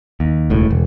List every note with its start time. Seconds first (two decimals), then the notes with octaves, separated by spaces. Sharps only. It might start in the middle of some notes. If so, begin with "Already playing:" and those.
0.20 D#2
0.50 E1 C#2 A2
0.71 E1